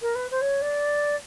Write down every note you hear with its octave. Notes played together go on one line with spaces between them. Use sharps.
A#4
B4
C5
C#5
D5